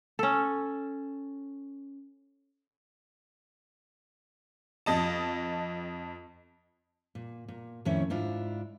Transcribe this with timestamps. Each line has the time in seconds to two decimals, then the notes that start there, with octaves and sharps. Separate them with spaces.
0.19 C#4 A4
4.86 F2 D#5 A5
7.15 A#2
7.48 A#2
7.85 F2 A2 D#3 C#4 E4 C#5
8.10 G#2 D4 E4 F4